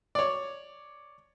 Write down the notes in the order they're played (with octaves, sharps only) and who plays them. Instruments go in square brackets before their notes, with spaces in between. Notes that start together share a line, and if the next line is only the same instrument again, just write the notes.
[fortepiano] C#5 D5